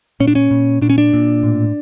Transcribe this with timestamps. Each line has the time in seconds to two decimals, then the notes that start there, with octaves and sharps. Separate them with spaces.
0.20 A#2 C#4
0.28 D4
0.35 C#4
0.51 A#2
0.82 A#2 D4
0.90 C#4
0.98 D4
1.13 A#2
1.43 A2